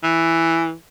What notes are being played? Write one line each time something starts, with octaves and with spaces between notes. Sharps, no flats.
E3